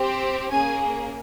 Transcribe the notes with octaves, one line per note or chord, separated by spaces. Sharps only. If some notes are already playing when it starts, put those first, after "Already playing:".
Already playing: C4 G4
A#3 C#4 G#4 G#5